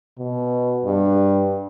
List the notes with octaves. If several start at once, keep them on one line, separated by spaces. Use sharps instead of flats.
B2
G2